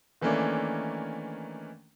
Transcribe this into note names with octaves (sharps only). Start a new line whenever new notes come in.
D#3 E3 A3 A#3 C#4 D4